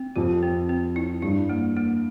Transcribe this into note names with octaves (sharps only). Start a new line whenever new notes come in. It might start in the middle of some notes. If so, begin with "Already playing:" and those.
Already playing: C4
F2 G4
C4
C4
E4
G2 E4
A#3
A#3